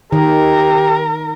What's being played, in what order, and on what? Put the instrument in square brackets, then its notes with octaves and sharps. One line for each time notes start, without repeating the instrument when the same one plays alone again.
[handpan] D#3 [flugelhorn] G4 [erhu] A#4